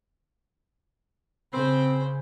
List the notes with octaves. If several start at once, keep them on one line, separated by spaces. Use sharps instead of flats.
C#3 C4 C5 B5